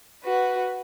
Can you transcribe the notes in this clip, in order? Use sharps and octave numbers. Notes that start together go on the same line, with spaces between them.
F#4 B4